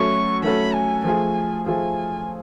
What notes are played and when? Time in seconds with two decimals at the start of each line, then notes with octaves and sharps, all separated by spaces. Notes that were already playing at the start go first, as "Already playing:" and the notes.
Already playing: F#3 A3 C#4 F#4 A4 C#6
0.43 F#3 A3 C#4 F#4 A4 B5
0.74 G#5
1.04 F3 A3 F4 G#4 G#5
1.66 F3 A3 F4 G#4 G#5